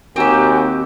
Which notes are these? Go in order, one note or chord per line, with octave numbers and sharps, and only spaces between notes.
D#2 C4 F#4 G4 G#5 A#5